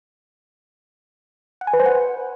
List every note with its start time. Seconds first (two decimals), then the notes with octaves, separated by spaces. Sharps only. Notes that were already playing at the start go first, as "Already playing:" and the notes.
1.61 F#5
1.67 G#5
1.73 B4
1.80 C5
1.86 F#5